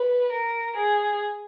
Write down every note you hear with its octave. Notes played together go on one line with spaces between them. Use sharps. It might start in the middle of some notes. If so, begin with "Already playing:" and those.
Already playing: B4
A#4
G#4